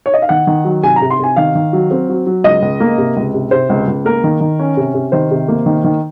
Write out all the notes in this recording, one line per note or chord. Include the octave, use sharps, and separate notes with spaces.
C#5
D#5
F5
D#3 F#5
D#3
F#3
C3 G#5
A#5
C3
C6
C3 G#5
D#3 F5
D#3
F#3
C4
F#3
F#3
C#2 D#5
C#2
A#3
C3
C#2
C3
C3 C5
C#2
C#2
A#3 A#4
D#3
D#3
C#4
C3
C3
D#3 C5
C3
A#3
D#3
D#3